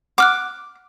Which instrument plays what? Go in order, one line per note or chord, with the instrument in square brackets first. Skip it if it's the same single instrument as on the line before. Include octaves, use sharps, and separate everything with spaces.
[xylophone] F#5 F6 F#6 [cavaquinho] D6